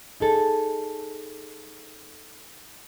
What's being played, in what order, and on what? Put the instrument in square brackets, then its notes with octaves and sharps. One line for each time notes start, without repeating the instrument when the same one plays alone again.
[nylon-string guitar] D#4 G#4 A4